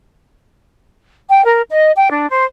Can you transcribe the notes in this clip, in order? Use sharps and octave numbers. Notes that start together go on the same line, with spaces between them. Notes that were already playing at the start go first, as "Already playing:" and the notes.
G5
A#4
D#5
G5
D4
C5